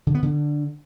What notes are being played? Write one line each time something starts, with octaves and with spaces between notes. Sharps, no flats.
D3
B3
D3